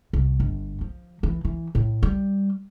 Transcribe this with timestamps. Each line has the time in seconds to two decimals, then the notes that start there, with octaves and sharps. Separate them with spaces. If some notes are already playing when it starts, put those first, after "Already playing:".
0.13 C2
0.40 G1
0.81 F3
1.23 E3
1.45 E3
1.75 A2
2.03 G3